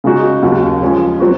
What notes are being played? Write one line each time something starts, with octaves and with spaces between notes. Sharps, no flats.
C#3 G#3 D#4 F#4
D#2 C#3 F#3
F3 G#3 C#4 G#4
F#3 C4 F#4